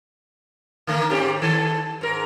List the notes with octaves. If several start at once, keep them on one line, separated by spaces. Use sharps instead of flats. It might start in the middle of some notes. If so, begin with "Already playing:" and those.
D3 A3 A#3
G#2 C4 G4
D#3 A4
G#2 A#4